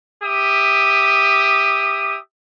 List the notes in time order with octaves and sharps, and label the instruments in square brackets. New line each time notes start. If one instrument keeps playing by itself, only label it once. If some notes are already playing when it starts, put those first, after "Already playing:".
[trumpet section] G4 E5 D#6